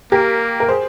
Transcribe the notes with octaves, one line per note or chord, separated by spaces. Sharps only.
A#3 G4 A#4
A#4
G#4 C5